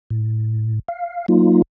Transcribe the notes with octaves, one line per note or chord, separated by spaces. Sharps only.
A2
F5
F#3 A#3 D#4 F4